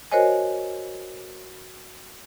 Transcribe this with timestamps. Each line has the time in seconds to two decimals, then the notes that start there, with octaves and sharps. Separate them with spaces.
0.12 F#4 A#4 C5 C#5 D#5 G#5